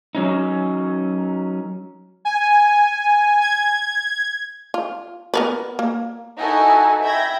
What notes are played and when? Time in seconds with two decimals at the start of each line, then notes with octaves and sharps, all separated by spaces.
0.15 F#3 C#4 D#4
2.25 G#5
3.41 G#6
4.74 F4
5.34 B3 A#4 B4
5.79 A#3
6.38 D#4 E4 F#4 A4 F#5 G#5
7.03 E5 G5 B5 G6 G#6 A#6